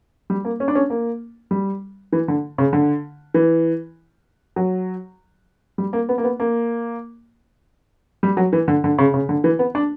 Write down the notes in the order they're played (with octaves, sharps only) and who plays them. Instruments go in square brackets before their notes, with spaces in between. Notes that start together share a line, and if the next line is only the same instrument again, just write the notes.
[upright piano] G3
A#3
C#4
D4
C#4
A#3
G3
E3
D3
C#3
D3
E3
F#3
G3
A#3
B3
A#3
B3
A#3
G3
F#3
E3
D3
D3
C#3
C#3
D3
E3
B3
D4